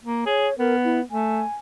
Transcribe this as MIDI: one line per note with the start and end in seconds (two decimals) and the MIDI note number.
0.04 0.24 58
0.26 0.48 68
0.26 0.57 73
0.59 1.01 59
0.59 0.76 70
0.84 1.01 64
1.10 1.43 57
1.10 1.53 80